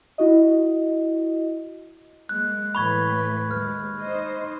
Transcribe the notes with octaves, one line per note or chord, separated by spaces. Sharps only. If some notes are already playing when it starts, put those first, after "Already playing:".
E4 F#4 D#5
G#3 A#3 F#6
A2 E3 B4 B5 C#6 G#6
D#2 G#3 F6
D#4 C5 D#5